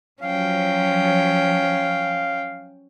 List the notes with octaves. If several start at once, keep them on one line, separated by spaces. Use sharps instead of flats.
F3 F#3 C#4 F5 G5